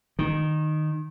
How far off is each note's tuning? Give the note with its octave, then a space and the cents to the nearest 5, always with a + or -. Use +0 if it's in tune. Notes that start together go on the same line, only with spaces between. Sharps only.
D#3 -15